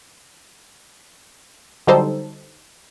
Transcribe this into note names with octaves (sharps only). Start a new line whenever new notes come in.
D3 F#3 G3 D#4 A4 C5